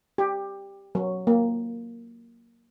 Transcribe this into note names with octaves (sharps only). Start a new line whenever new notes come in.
G4
F#3
A#3